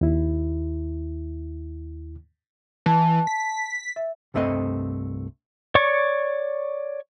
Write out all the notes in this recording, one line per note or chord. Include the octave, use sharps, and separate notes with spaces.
D#2 E4
E3 A5
B6
E5
C2 G2 A3 C4 D#5
C#5 D5 C#6